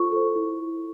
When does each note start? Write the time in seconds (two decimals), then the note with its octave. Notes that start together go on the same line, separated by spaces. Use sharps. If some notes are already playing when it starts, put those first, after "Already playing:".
Already playing: F4 A4 C5 C#6
0.12 A4 C5
0.36 E4